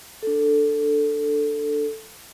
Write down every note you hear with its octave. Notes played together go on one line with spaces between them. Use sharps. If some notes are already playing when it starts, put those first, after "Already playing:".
D4 A4